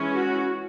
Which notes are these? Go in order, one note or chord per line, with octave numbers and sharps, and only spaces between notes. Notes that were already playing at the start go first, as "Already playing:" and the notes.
Already playing: E3 G#3 C#4
F#4